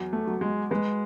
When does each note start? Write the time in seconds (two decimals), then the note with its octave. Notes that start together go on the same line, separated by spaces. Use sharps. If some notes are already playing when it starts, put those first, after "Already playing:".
Already playing: E2 F#3
0.13 A3
0.27 F#3
0.41 G#3
0.71 G#3 B4